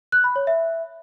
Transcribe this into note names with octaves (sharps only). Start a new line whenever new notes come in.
F#6
B5
C#5
E5